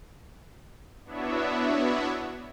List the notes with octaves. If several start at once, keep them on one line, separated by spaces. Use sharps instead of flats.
B3 D4 E4 F#4 C#5 E5